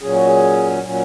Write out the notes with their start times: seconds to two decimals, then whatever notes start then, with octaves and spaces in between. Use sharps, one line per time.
0.01 A#2 F#3 C#4 G#4
0.14 F#4
0.26 G#4
0.82 A#2 F#3 C#4